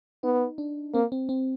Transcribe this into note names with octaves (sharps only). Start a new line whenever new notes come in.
B3 D#4
D4
A#3 C4
C4
C4